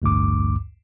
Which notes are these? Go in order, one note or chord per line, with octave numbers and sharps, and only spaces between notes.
A1 D2 G2 D6